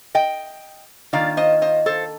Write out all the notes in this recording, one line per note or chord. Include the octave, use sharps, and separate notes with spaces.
D#5 G5
D#3 A#3 D4 F4 D5 F5
C5 D#5
C5 D#5
A4 C5